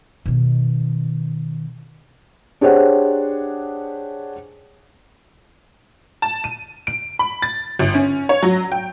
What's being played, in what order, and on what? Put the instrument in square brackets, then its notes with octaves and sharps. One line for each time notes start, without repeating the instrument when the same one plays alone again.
[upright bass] B2 D#3
[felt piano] D4 G4 G#4 C5 C#5 F#5
[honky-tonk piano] A5
D#7
D7
B5
A6
G1
C#4
C#5
F#3
G5